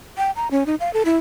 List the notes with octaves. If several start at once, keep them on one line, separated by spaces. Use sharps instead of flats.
G5
A#5
C#4
D#4
F5
A4
E4